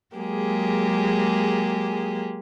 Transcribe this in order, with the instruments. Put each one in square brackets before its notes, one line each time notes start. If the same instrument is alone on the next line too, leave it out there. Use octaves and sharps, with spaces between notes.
[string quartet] F#3 G#3 A#3 G4 G#4